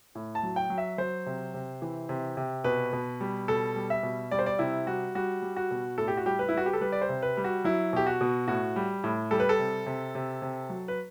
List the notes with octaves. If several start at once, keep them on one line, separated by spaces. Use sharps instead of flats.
A2
A5
F#3
G5
F#3
E5
F#3 C5
C3
C3
E3
C3
C3
B2 B4
B2
G3
B2 A4
G3
E5
B2
G3 D5
C5
D5
C3 E4
G3 F#4
G3 F#4
G3
F#4
B2
A2 A4
G4
F#4
G3 G4
B4
E4
G3 F#4
G4
A4
G3 B4
D5
C5
C3
B4
G3
F#4
F#3 E4
B2 G4
F#4
B2
A2 F#4
G3
A2
G3 A4
B4
A4
C3
C3
C3
C3
F#3
B4